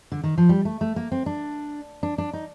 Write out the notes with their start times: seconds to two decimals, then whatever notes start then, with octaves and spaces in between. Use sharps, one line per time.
0.12 D3
0.24 D#3
0.38 F3
0.49 G3
0.65 A3
0.81 A3
0.96 A#3
1.12 C4
1.26 D4
2.03 D4
2.18 D4
2.34 D#4